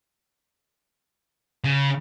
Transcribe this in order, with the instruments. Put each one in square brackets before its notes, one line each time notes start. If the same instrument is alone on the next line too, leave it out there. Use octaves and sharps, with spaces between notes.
[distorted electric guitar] C#3